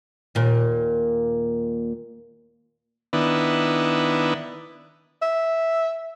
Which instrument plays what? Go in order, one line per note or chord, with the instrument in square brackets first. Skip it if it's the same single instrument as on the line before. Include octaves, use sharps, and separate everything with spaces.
[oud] D#2 A#2
[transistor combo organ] D#3 B3 D4 E4
[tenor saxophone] E5